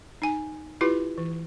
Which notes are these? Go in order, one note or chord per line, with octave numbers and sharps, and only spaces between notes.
D#4 G#5
E4 F4 G4 B4
E3